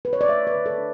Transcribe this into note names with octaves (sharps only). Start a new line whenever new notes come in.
B4
C#5
D5
A3 E5
B4
D3
A4
D4